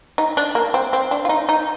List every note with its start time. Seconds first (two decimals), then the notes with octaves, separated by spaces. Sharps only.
0.18 D#4
0.37 D4
0.55 A#3
0.74 C4
0.93 C4
1.11 D4
1.25 F4
1.29 D#4
1.49 D#4